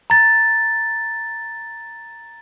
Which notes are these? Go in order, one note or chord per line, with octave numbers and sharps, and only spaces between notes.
A#5 A6